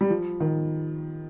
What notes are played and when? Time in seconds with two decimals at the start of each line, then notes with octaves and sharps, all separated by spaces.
0.01 G3
0.10 F3
0.40 D#3